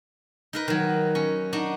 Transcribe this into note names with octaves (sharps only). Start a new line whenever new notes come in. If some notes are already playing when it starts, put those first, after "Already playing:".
D#4 A#4 B4
D#3 F#3
C#4
D4 D#4 F#4